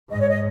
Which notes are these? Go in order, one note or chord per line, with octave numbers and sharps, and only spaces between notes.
G#2 D#5
C#5
D#5